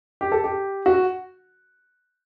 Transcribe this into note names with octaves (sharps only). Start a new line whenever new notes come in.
G4
A4
G4
F#4